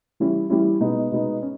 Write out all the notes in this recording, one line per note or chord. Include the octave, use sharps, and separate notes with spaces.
E3 G3 C#4 E4
E3 G3 C#4 E4
B2 G#3 B3 D#4
B2 G#3 B3 D#4
C#4